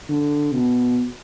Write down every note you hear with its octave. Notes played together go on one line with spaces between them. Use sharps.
D3
B2